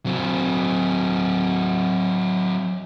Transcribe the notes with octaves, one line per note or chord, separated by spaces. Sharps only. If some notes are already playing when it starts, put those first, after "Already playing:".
F#3 C4